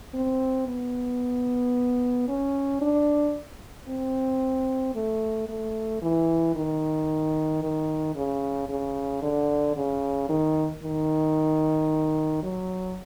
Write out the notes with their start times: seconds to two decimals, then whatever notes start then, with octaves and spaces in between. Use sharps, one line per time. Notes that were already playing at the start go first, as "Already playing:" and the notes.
0.14 C4
0.68 B3
2.28 C#4
2.82 D4
3.88 C4
4.95 A3
5.49 A3
6.02 E3
6.56 D#3
7.63 D#3
8.16 C#3
8.69 C#3
9.23 D3
9.76 C#3
10.29 D#3
10.83 D#3
12.43 F#3